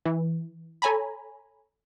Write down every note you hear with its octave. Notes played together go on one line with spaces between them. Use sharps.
E3
A4 C#5 G#5 A#5 B5